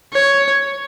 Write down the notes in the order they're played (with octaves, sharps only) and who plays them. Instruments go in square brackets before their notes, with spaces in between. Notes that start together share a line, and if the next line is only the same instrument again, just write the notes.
[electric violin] C#5